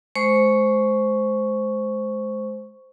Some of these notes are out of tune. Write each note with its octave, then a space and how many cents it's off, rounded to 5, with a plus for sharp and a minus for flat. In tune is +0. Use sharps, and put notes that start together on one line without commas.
G#3 +35 C5 -5 C#6 +0